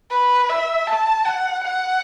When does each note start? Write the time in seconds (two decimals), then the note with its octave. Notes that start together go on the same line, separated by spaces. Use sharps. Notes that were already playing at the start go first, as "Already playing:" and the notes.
0.11 B4
0.49 E5
0.87 A5
1.25 F#5
1.64 F#5